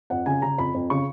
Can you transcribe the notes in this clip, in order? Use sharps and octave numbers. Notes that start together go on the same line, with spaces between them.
F2 F#5
C#3 G#5
C#3 A#5
F2 B5
F2
C#3 C#6